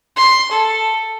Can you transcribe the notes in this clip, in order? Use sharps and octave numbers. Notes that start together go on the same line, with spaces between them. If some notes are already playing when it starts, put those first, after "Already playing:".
C6
A4